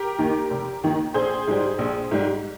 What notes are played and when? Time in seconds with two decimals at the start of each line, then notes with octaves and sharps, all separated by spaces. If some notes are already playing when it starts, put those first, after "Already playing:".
Already playing: G4 A#4
0.19 D#2 D#3 A#3
0.50 F1
0.83 D#2 D#3 A#3
1.14 A#1 G#4 C5
1.48 G#2 G3
1.78 A#1
2.11 G#2 G3